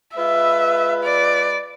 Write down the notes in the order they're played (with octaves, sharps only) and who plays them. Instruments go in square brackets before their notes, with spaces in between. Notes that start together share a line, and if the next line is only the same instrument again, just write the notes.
[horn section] G#3 F4 B4 [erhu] E5
[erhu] D5